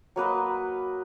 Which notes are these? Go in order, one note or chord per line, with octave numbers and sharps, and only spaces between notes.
F#3 A#3 B4 D#5